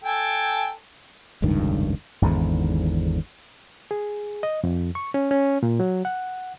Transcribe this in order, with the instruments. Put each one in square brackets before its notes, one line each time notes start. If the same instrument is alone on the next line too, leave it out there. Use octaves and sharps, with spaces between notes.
[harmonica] A4 G5 G#5
[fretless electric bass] F1 C#2 G2 D#3
[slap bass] G#1 E2 G#2 D3
[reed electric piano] G#4
D#5
F2
C#6
C#4
C#4
A#2
F#3
F#5